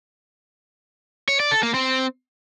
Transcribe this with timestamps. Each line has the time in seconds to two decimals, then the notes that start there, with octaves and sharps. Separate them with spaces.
1.28 C#5
1.40 D5
1.51 A4
1.63 A#3
1.74 C4